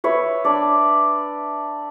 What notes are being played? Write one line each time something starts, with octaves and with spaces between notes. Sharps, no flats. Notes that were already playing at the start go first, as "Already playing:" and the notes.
B4 C#5 E5
D4 D5